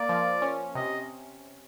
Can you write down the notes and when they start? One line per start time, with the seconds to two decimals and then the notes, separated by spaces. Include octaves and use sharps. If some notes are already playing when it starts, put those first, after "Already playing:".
Already playing: A#3 D5
0.09 F3
0.42 C#4
0.75 C3 D#5